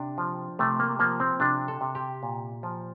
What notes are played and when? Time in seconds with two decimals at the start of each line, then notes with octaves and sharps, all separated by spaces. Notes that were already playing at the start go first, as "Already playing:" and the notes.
Already playing: C3 D4
0.18 F3
0.59 C3 A3
0.80 A#3
0.99 F3 A#3
1.20 C4
1.40 C3 D4
1.68 A4
1.81 C3
1.95 G4
2.23 A#2
2.63 F3